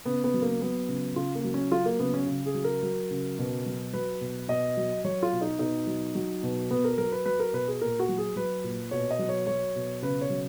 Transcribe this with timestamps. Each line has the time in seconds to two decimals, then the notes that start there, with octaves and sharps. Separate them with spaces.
0.05 C#3 B3
0.24 B3
0.34 F#3
0.42 A#3
0.61 F#3 B3
0.89 C#3
1.16 C#3 F4
1.35 A#3
1.44 F#3
1.54 C#4
1.72 F#3 F4
1.86 A#3
2.00 C#3 B3
2.14 C#4
2.27 C#3
2.46 G#4
2.54 F#3
2.64 A#4
2.83 F#3
3.11 C#3
3.39 B2
3.66 F#3
3.93 F#3 B4
4.21 B2
4.48 B2 D#5
4.77 F#3
5.05 F#3 C#5
5.23 F4
5.32 B2
5.41 D#4
5.59 B2 D#4
5.87 F#3
6.15 F#3
6.43 B2
6.71 B2 B3
6.84 A#4
6.98 F#3 A#4
7.12 B4
7.26 F#3 B4
7.40 A#4
7.53 B2 B4
7.68 G#4
7.81 A#2 A#4
7.99 F#4
8.09 F#3
8.18 G#4
8.36 F#3 B4
8.64 A#2
8.91 B2 C#5
9.11 D#5
9.19 F#3
9.29 C#5
9.47 F#3 C#5
9.76 B2
10.02 C#3 B4
10.21 C#5
10.30 F#3